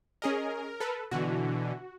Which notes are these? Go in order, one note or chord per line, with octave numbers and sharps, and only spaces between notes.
C#4 G#4 A#4 D#5
A4 B4
B2 D3 E3 F#4